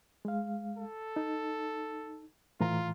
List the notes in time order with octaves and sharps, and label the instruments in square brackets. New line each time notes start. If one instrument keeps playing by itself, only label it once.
[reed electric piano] G#3 F5
[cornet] A4
[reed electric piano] D#4
[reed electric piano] A2 E3 A#5 [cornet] F4